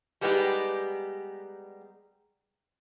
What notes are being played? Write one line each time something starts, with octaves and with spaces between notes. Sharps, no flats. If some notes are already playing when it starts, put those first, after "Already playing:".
G3 G#3 B3 D#4 G4